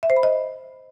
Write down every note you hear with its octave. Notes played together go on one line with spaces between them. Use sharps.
E5
C5
B5
D#5